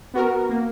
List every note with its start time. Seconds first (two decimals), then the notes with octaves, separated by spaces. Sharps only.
0.14 B3 F#4 A#4
0.49 A#3